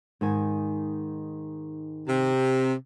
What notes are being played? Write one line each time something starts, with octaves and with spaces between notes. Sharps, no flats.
G#2 D#3 G#5
C3